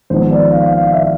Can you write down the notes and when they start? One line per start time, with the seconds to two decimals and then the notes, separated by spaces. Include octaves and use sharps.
0.10 G#1 G#2 F3 B3 C5
0.31 D5
0.52 F5
0.72 F5
0.93 E5